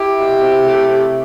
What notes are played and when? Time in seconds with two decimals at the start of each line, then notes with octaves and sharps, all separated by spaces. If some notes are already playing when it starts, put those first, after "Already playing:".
Already playing: E4 G4
0.17 B2
0.41 C3
0.65 A3
0.90 C3